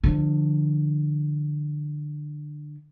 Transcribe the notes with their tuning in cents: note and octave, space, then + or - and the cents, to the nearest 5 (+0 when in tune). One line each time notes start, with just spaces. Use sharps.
D3 +20 F3 -15